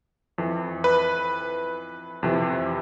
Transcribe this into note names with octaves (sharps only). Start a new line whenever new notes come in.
F2 E3
B4
F2 C3 E3